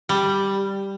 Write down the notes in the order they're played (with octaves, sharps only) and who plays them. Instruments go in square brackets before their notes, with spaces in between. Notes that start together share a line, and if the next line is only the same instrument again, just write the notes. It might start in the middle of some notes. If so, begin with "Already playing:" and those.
[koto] G3